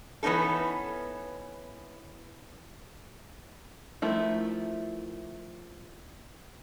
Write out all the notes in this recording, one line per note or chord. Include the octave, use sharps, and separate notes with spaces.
E3 B3 C#4 D#4 A4
D#3 F3 A3 E4